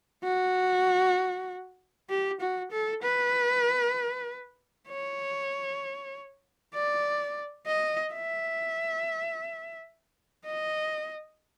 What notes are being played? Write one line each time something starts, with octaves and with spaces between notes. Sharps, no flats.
F#4
G4
F#4
A4
B4
C#5
D5
D#5
E5
D#5